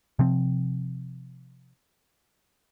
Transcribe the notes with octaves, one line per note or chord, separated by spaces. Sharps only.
C3 F3 C4